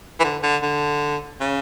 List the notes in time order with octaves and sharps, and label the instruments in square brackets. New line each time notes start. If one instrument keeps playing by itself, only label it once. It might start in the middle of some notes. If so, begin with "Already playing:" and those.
[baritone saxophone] E3
D3
D3
D3
C#3